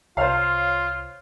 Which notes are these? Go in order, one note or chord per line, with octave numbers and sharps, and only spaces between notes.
C2 F4 C5 C#5 F5 F6